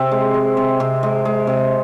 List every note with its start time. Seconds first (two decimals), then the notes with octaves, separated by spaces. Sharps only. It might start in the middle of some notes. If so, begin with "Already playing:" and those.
Already playing: C3 C4
0.11 G#3
0.34 G#3
0.57 C3
0.80 C3
1.03 G#3
1.25 G#3
1.47 C3